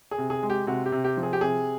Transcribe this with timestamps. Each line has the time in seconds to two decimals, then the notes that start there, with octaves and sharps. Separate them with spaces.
0.11 G#4
0.18 C3
0.30 G#4
0.43 G#3
0.50 G4
0.67 C3 F#4
0.86 G4
0.92 C3
1.04 G4
1.17 F3
1.23 G#4
1.33 G4
1.41 C3 G#4